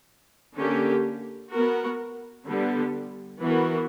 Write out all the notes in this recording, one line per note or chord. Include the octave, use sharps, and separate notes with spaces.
D3 A#3 C#4 G4
B3 F#4 A#4
D3 G3 B3
E3 B3 F#4 A#4